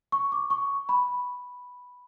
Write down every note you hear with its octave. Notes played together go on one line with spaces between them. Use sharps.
C#6
D6
C#6
B5